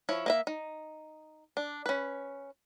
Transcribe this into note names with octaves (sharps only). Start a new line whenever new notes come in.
F3 E4 C#5
A#3 D#5 E5
D#4
D4
C#4 B4